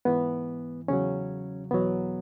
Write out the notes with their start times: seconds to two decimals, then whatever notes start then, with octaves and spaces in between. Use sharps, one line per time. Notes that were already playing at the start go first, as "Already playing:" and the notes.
0.05 G#2 E3 B3
0.88 E2 C#3 F#3 C#4
1.71 E2 B2 F#3 B3